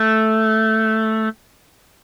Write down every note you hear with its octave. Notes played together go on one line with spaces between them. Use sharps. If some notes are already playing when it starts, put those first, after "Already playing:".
Already playing: A3